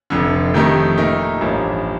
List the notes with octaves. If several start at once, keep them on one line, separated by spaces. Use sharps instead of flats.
F1 F2 D3
F2 D#3 A3 D#4 G4
A#2 A3 D#4 A#4
A1 G2 F3 A#3